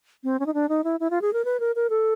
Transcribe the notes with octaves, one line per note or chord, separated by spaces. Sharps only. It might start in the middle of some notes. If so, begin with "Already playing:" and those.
C4
C#4
D#4
D4
D#4
E4
E4
F4
G#4
A#4
B4
A#4
A#4
A4